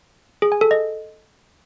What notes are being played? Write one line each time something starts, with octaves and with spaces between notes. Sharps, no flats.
G#4
G#5
A4
D#5